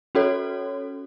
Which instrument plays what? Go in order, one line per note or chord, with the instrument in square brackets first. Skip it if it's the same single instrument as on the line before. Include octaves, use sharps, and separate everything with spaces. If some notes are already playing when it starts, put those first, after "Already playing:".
[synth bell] C#4 F#4 A4 C#5